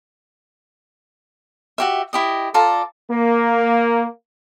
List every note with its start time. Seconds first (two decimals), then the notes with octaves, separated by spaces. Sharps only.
1.78 F#4 G4 E5
2.13 E4 G4 D#5
2.54 F4 A4 D5 A#5
3.11 A#3